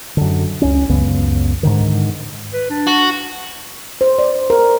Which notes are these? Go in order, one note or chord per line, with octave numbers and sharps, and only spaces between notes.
F#2 D3
C#2 C#4
C#2 F#2 C#3 B3
G#2 D3 D#3
B4
D4
F#4
C5
D5
A#4